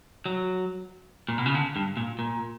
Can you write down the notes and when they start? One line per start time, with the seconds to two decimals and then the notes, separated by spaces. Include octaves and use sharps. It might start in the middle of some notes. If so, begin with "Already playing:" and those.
0.26 F#3
1.29 A#2
1.38 B2
1.46 C#3
1.55 D3
1.76 G2
1.97 A#2
2.19 A#2